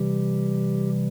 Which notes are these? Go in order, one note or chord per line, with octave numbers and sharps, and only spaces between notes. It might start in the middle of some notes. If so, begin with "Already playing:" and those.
Already playing: C3 E3 G3 G4